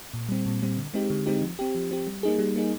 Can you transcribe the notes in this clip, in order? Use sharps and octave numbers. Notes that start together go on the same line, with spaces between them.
A#2
G3 C4
A#2
G3 C4
D3
G#3 C4 D#4 G4
D3
G#3 C4 D#4 G4
F3
C4 G4
F3
C4 G4
G3
A#3 D#4 G#4
G3
A#3 D#4 G#4